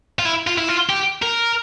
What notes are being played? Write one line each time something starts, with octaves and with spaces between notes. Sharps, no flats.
F4
E4
F4
E4
F4
G4
A#4